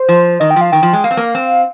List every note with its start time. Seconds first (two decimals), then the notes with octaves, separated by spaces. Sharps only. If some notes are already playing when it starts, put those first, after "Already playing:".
Already playing: C5
0.09 F3
0.40 D#3 D#5
0.51 G5
0.56 F3 F5
0.72 D#3 G5
0.83 F3
0.93 G#3
1.04 A#3 F5
1.11 C4
1.17 A#3
1.35 C4